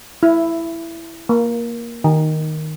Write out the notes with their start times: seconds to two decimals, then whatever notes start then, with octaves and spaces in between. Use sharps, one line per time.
0.23 E4
1.29 A#3
2.04 D#3